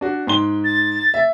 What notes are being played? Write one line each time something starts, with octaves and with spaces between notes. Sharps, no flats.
D4 F#4
G#2 C6 G7
A6
E5